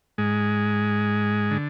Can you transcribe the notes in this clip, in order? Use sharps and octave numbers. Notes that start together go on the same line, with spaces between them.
G#2 G#3
D3